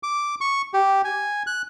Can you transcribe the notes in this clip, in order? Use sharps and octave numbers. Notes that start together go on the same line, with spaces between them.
D6
C#6
G4
G#5
F#6